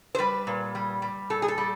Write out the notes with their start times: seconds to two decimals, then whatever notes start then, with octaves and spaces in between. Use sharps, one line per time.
0.15 C5
0.18 G3 B4
0.47 A#2
0.75 G3
1.02 G3
1.30 A#2 A4
1.42 G#4
1.48 A4
1.58 G3